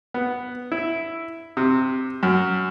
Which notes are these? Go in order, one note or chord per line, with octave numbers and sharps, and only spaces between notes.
B3
E4
C3
F#2